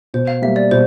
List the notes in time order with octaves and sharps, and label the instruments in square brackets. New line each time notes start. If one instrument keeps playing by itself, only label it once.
[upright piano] B2 [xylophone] C5
[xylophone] F5
[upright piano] G3 A#3 [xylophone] E5
[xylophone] D5
[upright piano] B2 [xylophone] C5